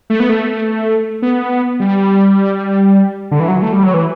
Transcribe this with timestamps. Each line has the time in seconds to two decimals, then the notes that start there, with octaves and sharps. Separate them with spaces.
0.10 A3
0.20 B3
0.29 A3
1.22 B3
1.79 G3
3.31 D3
3.40 E3
3.48 F#3
3.62 A3
3.72 G3
3.83 F#3
3.94 E3